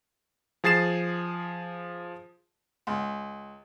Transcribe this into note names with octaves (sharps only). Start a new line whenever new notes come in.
F3 G#4 A6 C7 E7
C#2